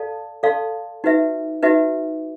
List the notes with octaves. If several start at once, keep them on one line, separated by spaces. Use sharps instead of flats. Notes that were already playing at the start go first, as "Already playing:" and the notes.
Already playing: A4 D5 F5 A5
A4 D5 F5 A5 C6
D#4 F#4 B4 E5
D#4 F#4 B4 E5